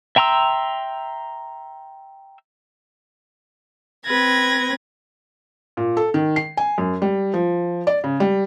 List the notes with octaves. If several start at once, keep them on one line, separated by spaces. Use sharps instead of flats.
E5 G5 A#5 C6 E6
C4 B4 G#6 A#6
A#2
A4
D#3
C7
G#5
F#2
G3
F3
D5
C#3
G3